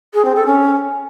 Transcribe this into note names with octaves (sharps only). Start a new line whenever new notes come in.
G#4
C4
A4
C#4